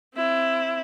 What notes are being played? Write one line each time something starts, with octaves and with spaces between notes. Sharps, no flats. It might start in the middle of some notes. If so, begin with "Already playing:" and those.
C4 E4